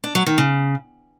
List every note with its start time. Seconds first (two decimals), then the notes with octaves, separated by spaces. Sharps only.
0.04 D4
0.15 F#3
0.26 D#3
0.38 C#3